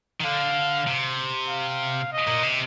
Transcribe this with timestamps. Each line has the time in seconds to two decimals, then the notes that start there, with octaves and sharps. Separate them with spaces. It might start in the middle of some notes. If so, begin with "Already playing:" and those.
0.21 D#3
0.25 D3 F5
0.88 C3
1.49 F5
2.13 D#5
2.27 A#2
2.43 C3